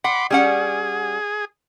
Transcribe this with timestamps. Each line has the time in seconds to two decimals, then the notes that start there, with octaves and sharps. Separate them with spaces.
0.04 F#5 B5 C6 D6
0.31 G3 C#4 G#4 F#5